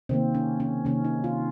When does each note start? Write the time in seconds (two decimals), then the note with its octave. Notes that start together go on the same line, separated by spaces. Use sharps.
0.09 C3 D#3 A#3 C4
0.34 C#4
0.60 C#4
0.85 C3 D#3 A#3 C#4
1.04 D#4
1.24 F4